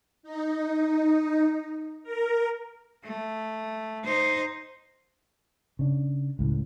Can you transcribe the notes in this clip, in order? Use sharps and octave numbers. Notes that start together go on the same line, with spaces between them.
D#4
A#4
A3
D#4 C5
C#3 D4
C#2 A2